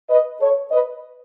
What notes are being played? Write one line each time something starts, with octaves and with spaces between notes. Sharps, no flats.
B4 D#5
A4 C#5
B4 D#5